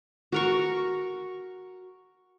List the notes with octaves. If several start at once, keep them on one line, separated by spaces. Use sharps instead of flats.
F#4 A#4 C#6